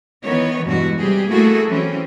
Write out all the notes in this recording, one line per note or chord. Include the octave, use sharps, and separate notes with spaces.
D#3 E3 B3 C#5
E2 G2 B2 E3 G#3 F#4
C3 G3 G4 G#4
A3 A#3 E4 F#4 G#4 A4
E3 F#3 C4 C#4